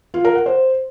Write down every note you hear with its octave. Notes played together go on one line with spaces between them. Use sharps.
F4
A#4
F#5
C5